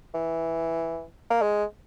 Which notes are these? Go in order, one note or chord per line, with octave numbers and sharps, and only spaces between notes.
E3
A#3
G#3